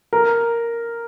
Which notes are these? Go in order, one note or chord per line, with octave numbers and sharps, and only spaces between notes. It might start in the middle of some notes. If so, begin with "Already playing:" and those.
A#4